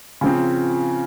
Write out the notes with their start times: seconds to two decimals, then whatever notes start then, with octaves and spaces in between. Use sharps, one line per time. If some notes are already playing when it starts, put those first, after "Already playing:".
0.21 C#3 F3 C4